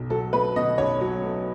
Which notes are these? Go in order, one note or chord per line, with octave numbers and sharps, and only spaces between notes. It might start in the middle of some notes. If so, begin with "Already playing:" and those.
Already playing: B1 B2
F#3 A4
A3 B4
B2 D#5
B1 C#5
F#3
A3